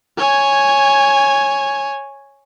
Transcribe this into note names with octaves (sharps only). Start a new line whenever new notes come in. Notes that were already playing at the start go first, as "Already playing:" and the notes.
C#5 G#5